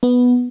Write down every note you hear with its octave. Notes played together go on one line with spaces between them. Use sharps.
B3